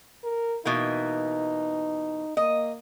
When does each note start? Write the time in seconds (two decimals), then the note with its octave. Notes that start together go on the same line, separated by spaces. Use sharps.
0.24 A#4
0.65 B2 E3 A#3 D#4
2.37 A#3 D#5